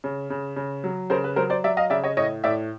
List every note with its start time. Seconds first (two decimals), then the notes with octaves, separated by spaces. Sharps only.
0.04 C#3
0.30 C#3
0.56 C#3
0.84 F#3
1.10 C#3 A#4 C5
1.24 B4
1.36 F#3 A#4 C5
1.50 C5 D5
1.64 F#3 D5 E5
1.77 D#5 F5
1.90 C#3 D5 E5
2.04 C#5 D#5
2.17 A2 C#5 D#5
2.44 A2 D5 E5